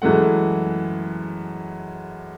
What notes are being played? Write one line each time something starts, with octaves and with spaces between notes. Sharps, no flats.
F#2 E3 G#3 A3 F#5